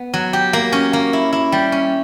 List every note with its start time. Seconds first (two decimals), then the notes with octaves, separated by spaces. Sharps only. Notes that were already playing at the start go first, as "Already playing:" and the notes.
Already playing: B3
0.14 F#3
0.33 G4
0.53 A#3
0.72 C#4
0.93 A#3
1.13 E4
1.33 E4
1.52 G3
1.72 C#4